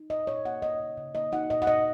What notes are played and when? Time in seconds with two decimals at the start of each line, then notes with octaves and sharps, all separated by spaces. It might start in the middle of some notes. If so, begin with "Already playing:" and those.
Already playing: D#4
0.10 A#2 D#5
0.27 A#2 C#5
0.45 A#3 F#5
0.62 C#4 D#5
0.80 C#3
0.97 C#3
1.15 A#3 D#5
1.32 D#4 F#5
1.50 A#2 D#5
1.62 F#5
1.67 A#2 D#5